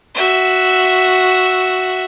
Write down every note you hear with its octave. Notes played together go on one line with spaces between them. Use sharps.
F#4 E5